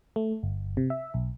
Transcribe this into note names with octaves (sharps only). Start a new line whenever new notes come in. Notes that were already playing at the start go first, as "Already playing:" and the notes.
A3
G1
C3
E5
B1